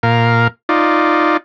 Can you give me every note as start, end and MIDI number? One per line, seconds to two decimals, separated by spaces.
0.03 0.48 46
0.03 0.48 70
0.03 0.48 77
0.69 1.37 63
0.69 1.37 65
0.69 1.37 74